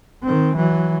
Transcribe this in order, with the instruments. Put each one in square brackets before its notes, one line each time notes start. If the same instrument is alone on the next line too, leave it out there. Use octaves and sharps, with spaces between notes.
[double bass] D#3 C4
E3 F#3